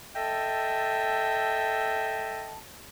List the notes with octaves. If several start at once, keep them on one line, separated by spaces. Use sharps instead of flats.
A4 D#5 E5 G5 A5